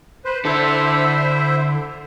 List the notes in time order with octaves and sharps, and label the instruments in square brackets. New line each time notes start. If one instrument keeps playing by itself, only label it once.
[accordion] B4 C5
[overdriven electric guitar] D3 A4 [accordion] E4 C5 E5